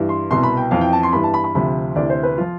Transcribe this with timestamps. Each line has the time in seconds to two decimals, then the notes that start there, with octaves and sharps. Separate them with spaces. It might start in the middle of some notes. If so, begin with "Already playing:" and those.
Already playing: G2 E3
0.09 C6
0.30 C2 B2 C6
0.43 B5
0.57 G5
0.71 F2 E3 F5
0.81 G5
0.93 A5
1.03 C6
1.13 G2 E3 B5
1.24 A5
1.34 B5
1.44 B5
1.55 D2 C3 F3 B5
1.95 D2 C3 E3 D5
2.10 C5
2.23 B4
2.38 F3 F4